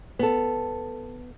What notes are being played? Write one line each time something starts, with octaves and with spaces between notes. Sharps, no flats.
B3 A4